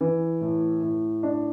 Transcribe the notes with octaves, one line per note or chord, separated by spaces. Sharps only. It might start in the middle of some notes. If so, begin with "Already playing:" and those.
E3
A2
A2
D4